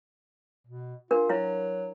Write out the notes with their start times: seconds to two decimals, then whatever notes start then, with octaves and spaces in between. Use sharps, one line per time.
0.67 B2
1.11 D4 F4 A#4
1.29 F#3 E4 F5